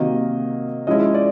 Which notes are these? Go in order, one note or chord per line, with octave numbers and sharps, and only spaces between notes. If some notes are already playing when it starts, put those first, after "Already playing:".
Already playing: C3 D#3 F#3 A#3 D#5
F3 G#3 C#4 E4 D#5
D5